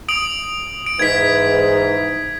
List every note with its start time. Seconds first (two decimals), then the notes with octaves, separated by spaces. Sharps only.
0.09 D#6 D7 F#7
0.86 D7
0.99 G#2 E3 G#6 B6